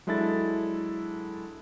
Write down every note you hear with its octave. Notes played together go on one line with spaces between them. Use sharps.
F#3 G#3 D4 E4 A4 A6